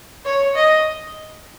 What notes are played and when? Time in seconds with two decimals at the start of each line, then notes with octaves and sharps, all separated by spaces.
0.25 C#5
0.55 D#5